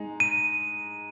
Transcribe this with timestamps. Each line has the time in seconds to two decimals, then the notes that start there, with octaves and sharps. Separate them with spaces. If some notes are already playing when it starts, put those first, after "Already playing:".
Already playing: G#3 D#4
0.20 D#7